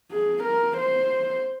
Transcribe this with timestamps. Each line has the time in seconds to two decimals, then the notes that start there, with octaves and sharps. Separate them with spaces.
0.11 G#4
0.44 A#4
0.77 C5